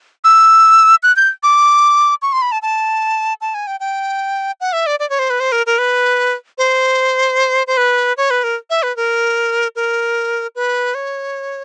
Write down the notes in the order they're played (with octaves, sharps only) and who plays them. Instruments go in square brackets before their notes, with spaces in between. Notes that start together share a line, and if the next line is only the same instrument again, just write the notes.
[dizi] E6
F#6
G6
D6
C#6
C6
B5
A5
A5
A5
G#5
G5
G5
F#5
E5
D5
D5
C#5
C5
B4
C5
A#4
A#4
B4
C5
C5
B4
C#5
B4
A#4
E5
B4
A#4
A#4
B4
C#5